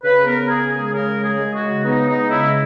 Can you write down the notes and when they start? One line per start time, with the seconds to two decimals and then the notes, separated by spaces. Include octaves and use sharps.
0.04 C#3 B4
0.26 B3 A#4
0.49 C#3 G#4
0.72 G#3 G#4
0.94 C#3 A#4
1.17 G#3
1.24 G#4
1.39 G#3
1.55 F#4
1.62 C#3
1.85 B3 D#4
2.08 G#3 D#4
2.30 C#3 E4